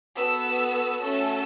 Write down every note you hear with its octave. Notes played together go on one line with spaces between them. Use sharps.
B3 F#4 A4 E6
A3 C#4 F#4 A4 E6